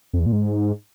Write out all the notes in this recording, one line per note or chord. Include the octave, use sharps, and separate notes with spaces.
F2
E2
A#2
G#2